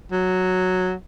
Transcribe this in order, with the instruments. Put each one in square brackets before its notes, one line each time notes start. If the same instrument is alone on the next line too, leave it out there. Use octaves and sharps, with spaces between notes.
[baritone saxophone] F#3